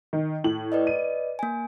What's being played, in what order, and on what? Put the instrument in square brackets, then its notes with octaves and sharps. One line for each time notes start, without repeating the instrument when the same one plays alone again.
[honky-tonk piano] D#3
A2 F#7
[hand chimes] B4 D5 D#5
[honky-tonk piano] D#7
[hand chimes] A#3 G#5